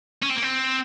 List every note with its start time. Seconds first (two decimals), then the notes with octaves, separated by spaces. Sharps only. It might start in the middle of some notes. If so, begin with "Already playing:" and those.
0.23 C#4
0.30 C4
0.36 A#3
0.43 C4